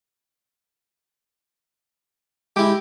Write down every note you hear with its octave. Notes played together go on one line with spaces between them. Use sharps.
G#3 E4 G4